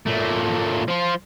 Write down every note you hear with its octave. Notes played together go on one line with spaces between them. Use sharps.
A#2 A3
F3 F4